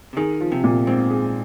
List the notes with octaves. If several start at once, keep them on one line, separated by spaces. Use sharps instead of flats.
C3
D#3 G#4
F3
C3
A#2
G#2 C4
G#4